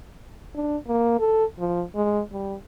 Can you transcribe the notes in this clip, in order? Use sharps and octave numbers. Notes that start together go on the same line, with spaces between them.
D4
A#3
A4
F3
G#3
G3